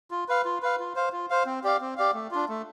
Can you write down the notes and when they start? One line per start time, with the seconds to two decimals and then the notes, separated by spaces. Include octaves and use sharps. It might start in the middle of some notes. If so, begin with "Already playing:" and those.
0.11 F4
0.28 B4 F5
0.45 F4
0.63 B4 F5
0.79 F4
0.96 C5 F5
1.12 F4
1.30 C5 F5
1.46 C4
1.64 G4 D5 F5
1.81 C4
1.97 G4 D5 F5
2.14 A3
2.31 D4 F4
2.49 A3